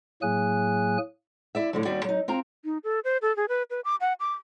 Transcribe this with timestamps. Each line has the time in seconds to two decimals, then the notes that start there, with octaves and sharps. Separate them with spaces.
0.22 A2 F#3 A#3 G#4 G#5 F#6
1.55 E4 D5 E5
1.73 A2 D3 F3
1.85 D#2 G3 B3 F#4 D5
2.04 F#3 D#4
2.28 C4 F4 A#4 A#5
2.65 D#4
2.84 A4
3.04 C5
3.22 A4
3.36 G#4
3.49 B4
3.70 B4
3.85 D6
4.01 F#5
4.20 D6